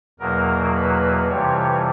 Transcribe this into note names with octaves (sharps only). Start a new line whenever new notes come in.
E2 B2 F#3 A#3 A#4
B4
F2 C3 E3 G3 C#5